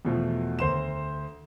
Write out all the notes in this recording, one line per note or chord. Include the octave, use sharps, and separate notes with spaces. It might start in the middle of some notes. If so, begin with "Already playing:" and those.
E2 B2 F3 A3
D2 C5 C6 E7